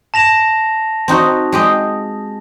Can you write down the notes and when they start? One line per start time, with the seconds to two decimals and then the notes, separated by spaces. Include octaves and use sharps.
0.14 A5 A#6 F7
1.08 C4 D#4 F#4
1.52 G#3 G4 D#5